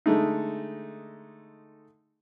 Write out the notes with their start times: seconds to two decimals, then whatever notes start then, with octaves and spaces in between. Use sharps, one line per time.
0.06 D3 G#3 A3 D#4